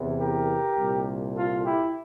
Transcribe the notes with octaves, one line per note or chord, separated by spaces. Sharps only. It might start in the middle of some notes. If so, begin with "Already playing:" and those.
Already playing: E2 C3 E3
G4 A#4
C2 A#2
F4 A4
E4 G4